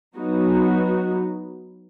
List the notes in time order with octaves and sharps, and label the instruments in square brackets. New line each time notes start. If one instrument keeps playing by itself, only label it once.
[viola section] F#3 B3 D#4 F#4